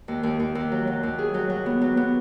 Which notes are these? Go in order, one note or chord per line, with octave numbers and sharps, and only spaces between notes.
D#2
D#2
D#2
D#2
F#3
F#3
D#2
G#4
F#3
F#3
B3
F#3
B3